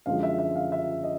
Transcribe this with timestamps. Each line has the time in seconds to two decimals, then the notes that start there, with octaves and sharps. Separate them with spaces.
0.06 F#2 D3 F3 G#3 F5
0.23 E5
0.38 E5
0.56 F5
0.72 E5
1.04 D#5